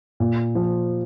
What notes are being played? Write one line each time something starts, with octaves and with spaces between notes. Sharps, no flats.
A#2
F3